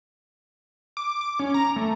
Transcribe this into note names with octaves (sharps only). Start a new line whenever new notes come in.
D6
D6
C#4
A#5
A3